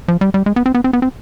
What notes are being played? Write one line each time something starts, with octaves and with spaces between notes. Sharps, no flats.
F3
G3
G3
G#3
B3
C4
B3
C4
B3
C4